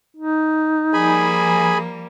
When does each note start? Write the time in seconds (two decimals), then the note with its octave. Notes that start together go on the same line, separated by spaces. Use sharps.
0.17 D#4
0.94 F3 G3 A#3 G#4 G#5 B5